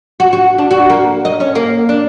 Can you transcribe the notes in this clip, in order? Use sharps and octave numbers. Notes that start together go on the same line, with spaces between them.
F#4
F#4
D4
F#4
A#3
D#5
C#4
A#3
D4